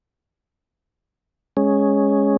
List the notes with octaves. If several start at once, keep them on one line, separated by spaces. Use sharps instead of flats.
G#3 C#4